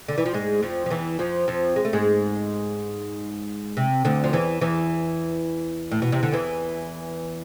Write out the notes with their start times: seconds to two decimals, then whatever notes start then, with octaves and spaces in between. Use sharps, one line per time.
0.08 D3
0.18 E3
0.26 F3
0.34 G#2 G#3
0.63 F2 F3
0.86 F3
0.90 E2 E3
1.19 F2 F3
1.48 F2 F3
1.76 G#3
1.85 A3
1.93 G#2 G#3
3.77 C3
4.05 D2 D3
4.24 F3
4.33 E2 E3
4.61 E2 E3
5.92 A2
6.02 B2
6.12 C3
6.23 D3
6.32 E2 E3